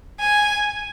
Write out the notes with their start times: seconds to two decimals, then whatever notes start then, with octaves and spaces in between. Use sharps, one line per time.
0.21 G#5